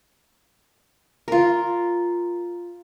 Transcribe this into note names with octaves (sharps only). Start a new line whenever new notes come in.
F4 A#4